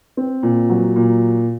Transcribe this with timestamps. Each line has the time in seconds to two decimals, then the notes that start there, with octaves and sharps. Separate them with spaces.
0.17 C4
0.43 A#2
0.70 F#3
0.96 A#2